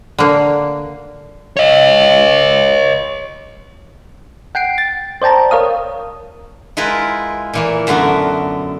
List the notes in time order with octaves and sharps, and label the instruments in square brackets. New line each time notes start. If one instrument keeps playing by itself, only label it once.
[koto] D3 A#3
[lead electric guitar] C#5 D#5
[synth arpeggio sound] F#5 G5 C7 D7
A6
C5 D5 G5 A5 A#5
A#4 C#5 F5 D#6
[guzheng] G#3 E4 F4 A#4 B4
A#2 E3 A#3
F#2 D3 A3 B3 A#4